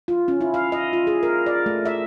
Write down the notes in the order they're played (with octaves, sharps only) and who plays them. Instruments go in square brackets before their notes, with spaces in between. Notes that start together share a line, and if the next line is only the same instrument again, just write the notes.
[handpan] F4
C#4
E4
F5
D#5
F4
G#4
A#4
D5
A3
E5